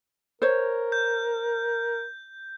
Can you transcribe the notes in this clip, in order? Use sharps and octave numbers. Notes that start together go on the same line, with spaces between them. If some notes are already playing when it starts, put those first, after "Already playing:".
A#4 C5 C#5
G6